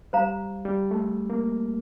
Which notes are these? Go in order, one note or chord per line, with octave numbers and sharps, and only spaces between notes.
G3 C5 F5 A#5
G3
A3
A#3